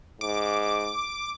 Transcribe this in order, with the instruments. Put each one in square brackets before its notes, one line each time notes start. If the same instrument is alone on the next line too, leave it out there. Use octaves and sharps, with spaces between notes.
[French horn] G#2 [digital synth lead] D6